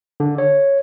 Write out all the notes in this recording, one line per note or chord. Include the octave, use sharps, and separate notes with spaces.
D3
C#5